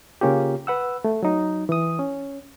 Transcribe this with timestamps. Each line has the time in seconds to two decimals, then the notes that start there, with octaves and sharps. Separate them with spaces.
0.21 C#3 A#3 C#4 F4 G4
0.67 B4 F#5 E6
1.05 A3
1.23 F#3 D#4
1.69 E3 D#6
1.99 C#4